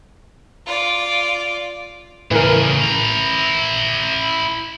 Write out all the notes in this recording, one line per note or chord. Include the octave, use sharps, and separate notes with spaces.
F4 D5
A2 C#3 E3 A#4
E4 A#5